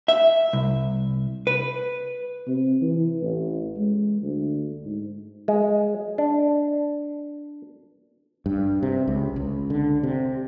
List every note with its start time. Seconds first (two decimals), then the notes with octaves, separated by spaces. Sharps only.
0.08 E5
0.53 C2
1.47 B4
2.47 C3
2.81 E3
3.22 A1
3.76 G#3
4.22 D2
4.85 G#2
5.48 G#3
6.18 D4
8.46 G2
8.83 C3
9.08 C#2
9.36 C#2
9.70 D3
10.03 C3